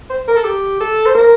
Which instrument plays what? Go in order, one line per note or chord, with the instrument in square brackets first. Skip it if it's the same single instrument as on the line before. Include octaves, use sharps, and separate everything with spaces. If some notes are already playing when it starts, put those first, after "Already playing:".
[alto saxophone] C5
A#4
A4
G4
A4
C5
A#4